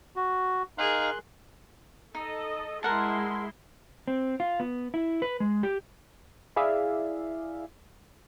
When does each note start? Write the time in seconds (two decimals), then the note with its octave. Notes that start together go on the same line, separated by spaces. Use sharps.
0.16 F#4
0.78 D#4 G#4 A#4 F5 C6 F#6
2.15 D#4 A4 D#5
2.83 G#3 E4 A#4 F#5 A5 C6
4.08 C4
4.40 F4
4.60 B3
4.94 E4
5.22 B4
5.40 G#3
5.63 G4
6.56 E4 G#4 D5 E5 F5